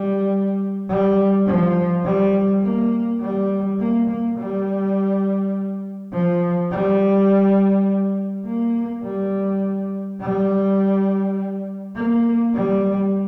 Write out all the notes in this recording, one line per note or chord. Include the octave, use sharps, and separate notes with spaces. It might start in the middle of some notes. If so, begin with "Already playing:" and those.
Already playing: G3
G3
F3
G3
A#3
G3
A#3
A#3
G3
F3
G3
A#3
G3
G3
A#3
G3